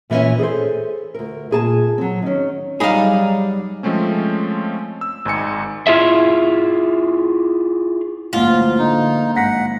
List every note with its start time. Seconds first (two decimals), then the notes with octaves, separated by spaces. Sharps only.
0.10 A#2 E3 F#3 C#4 E5
0.39 G#4 A4 C5
1.14 D2 A#4
1.51 A#2 G#4 A5
1.98 F#3 C4
2.22 D#3 C#4
2.80 F#3 G3 D#4 G#4 F5 B5
3.83 F3 G#3 A3 C4 C#4
5.01 E6
5.25 G#1 G#2 G#5 C#7
5.87 E4 F4 G#4 E5
8.33 A1 D2 G#2 F3 A#3 F4
8.78 D3 D#4
9.36 G#1 F#5 A#6 B6